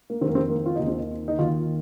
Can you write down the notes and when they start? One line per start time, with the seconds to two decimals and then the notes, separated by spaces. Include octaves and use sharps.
0.10 A#3
0.21 D#3 C4
0.24 F2 A#3
0.35 C4
0.50 A#3
0.66 F4
0.76 D#2 D#3 D#4
0.87 C4
0.98 D#4
1.28 D#4
1.39 D#2 D#3 F4